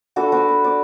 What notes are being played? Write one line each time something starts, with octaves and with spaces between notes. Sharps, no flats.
D4 F#4 A4 B4
F#4 B4 D5
B4
D5